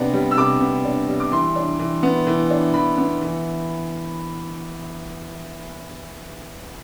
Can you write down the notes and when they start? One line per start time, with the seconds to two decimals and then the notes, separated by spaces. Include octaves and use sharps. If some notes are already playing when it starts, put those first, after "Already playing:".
Already playing: C3 B3 D4
0.14 G3
0.31 E6
0.37 C3 D6
0.61 B3
0.85 D4
1.08 G3
1.20 D6
1.32 E3 C6
1.56 D4
1.80 E3
2.03 B3
2.27 E3
2.50 D4
2.74 E3 B5
2.98 B3
3.21 E3